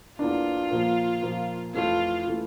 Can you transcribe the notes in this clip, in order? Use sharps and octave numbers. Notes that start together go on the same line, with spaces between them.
E2 E3 A#3 D4 F4
A#2 F3 A#3
A#2 F3 A#3
F2 E3 A3 E4 F4
E3 A3 E4